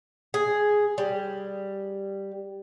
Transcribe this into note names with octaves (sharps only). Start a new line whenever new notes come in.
G#4
G3